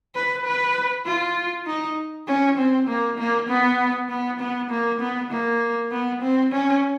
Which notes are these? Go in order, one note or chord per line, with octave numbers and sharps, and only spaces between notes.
B4
B4
F4
D#4
C#4
C4
A#3
A#3
B3
B3
B3
A#3
B3
A#3
B3
C4
C#4